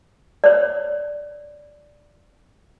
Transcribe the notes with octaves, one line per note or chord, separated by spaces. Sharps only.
C#5 D5